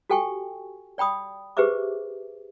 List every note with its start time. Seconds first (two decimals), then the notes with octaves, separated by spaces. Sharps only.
0.10 F#4 G4 A4 G5 G#5 C#6
0.98 D5 G5 B5 D#6
1.57 G4 G#4 B4 C5 E5 D6